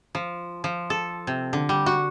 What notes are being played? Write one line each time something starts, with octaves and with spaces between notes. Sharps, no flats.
F3
F3
A4
C3
D3
G3
F#4